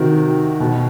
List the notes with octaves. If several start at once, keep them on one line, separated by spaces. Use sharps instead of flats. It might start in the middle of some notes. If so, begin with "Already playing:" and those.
Already playing: C3 D#3 F#4
B2